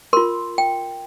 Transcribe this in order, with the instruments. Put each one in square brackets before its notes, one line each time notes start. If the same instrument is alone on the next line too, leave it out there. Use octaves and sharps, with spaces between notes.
[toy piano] F4 A#4 C6
G5